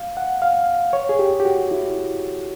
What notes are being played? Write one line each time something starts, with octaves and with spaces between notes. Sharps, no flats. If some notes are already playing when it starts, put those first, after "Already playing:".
Already playing: F5
F#5
F5
C#5
G#4
G4
G4
F#4
E4